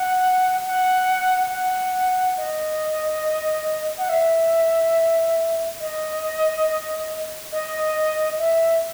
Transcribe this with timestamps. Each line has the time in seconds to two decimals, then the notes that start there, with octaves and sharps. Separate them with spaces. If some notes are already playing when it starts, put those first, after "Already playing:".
Already playing: F#5
0.65 F#5
1.51 F#5
2.37 D#5
3.98 F#5
4.09 E5
5.80 D#5
7.52 D#5
8.38 E5